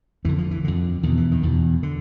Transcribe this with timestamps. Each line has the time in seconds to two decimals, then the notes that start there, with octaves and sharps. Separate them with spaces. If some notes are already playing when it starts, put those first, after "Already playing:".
0.25 F2 D3 E3
0.38 F3
0.51 E3
0.64 F2 D3
1.03 E2 B2 D#3
1.17 E3
1.32 D#3
1.43 E2 B2
1.83 D3